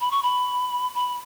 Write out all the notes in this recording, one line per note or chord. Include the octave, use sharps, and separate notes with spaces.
B5
C#6
B5
B5